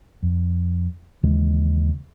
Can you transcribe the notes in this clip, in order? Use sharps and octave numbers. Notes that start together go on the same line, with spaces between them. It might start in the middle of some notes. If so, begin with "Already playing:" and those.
F2
D#2 C#3 E3 G#3